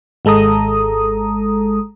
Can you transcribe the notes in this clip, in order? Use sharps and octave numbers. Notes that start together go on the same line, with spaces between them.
G#1 G#3 A4 A#5 D#6